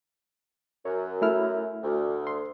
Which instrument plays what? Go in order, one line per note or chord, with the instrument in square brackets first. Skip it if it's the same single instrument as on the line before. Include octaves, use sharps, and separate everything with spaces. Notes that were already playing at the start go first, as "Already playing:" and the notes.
[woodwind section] F#2 [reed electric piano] C#5
[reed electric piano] A3 E4 F6
[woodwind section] D2
[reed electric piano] C6